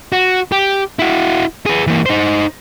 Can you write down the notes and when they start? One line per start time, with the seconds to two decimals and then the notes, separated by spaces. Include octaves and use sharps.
0.12 F#4
0.52 G4
0.99 E4 F#4
1.66 G#4 B4
1.87 E3 A#3
2.06 D#4 C5